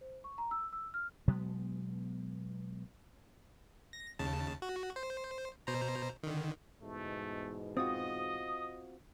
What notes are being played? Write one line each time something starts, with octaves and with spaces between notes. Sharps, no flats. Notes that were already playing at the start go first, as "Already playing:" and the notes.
C5
C#6
A#5
E6
E6
F6
B2 F#3 G#3 B3
A#6
D#2 C#3 A5
F#4
C5
B2 C5 A#5
D3 D#3
E2 G#2 B2 A3
C4 F4 F#4 D#5 D#6